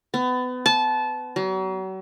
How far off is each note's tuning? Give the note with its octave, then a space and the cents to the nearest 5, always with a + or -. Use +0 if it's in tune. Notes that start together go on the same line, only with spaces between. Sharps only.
B3 +30
A5 -20
F#3 +40